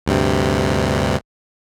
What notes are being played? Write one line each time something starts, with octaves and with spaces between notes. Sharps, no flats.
D2 G2 C3